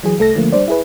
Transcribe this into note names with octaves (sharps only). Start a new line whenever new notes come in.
E3 F#3 G#4
C2 A3 A4 A#6
D3 F3 A3 A#3
G3 D4 C5 D5
E4 G#4 B4